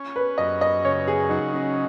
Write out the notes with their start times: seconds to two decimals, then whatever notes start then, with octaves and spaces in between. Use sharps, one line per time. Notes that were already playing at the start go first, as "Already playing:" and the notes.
Already playing: C#4
0.16 B4
0.38 F#2 D#5
0.61 D#5
0.85 C#3 C#5
1.07 G#4
1.29 F#3 D#4
1.54 C#4